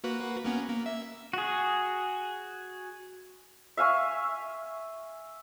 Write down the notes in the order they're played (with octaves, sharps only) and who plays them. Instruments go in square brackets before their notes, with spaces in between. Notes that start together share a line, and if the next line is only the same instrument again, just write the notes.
[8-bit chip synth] A#3 F#4 B4
A#3 B3 C#4
A#3
E5
[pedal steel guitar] F#4 G#4
[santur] E5 F5 G#5 C#6